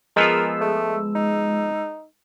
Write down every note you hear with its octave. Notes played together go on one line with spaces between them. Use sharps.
F3 G#3 B3 F4 A#4 E6
A3
D#4